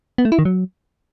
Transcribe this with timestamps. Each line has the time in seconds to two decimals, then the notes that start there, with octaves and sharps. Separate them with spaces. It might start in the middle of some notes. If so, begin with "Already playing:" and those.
0.18 B3
0.25 A3
0.32 E4
0.39 D#3
0.45 F#3